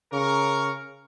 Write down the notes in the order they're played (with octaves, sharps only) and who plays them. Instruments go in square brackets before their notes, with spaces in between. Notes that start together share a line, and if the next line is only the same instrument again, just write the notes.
[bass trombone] C#3 [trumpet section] A#4 C#6